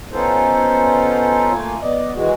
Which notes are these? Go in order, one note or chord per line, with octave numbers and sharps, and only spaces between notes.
B3 C#4 D#4 F4 A4 C5
A3 A#3 F4 G#5
B3 D5 D#5
D#3 E3 G#3 F#4